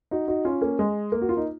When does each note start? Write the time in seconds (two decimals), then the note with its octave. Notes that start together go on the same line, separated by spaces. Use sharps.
0.11 D#4 F#4
0.28 D#4 F#4
0.45 C#4 F4
0.61 A#3 C#4
0.79 G#3
1.12 A#3
1.22 F#4
1.29 F4
1.37 D#4